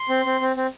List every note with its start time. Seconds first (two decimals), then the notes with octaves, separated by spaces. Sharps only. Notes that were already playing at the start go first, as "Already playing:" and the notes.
Already playing: C6
0.09 C4
0.25 C4
0.41 C4
0.56 C4